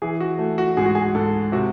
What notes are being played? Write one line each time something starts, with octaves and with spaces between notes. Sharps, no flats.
E3 G#4
F#4
A3
F#4
G#2 G#4
F#4
G#4
G#2 A4
C3 F#4